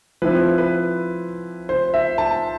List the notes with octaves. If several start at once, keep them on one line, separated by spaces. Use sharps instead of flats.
F3 C4 E4 B4
B4
C5
E5
A5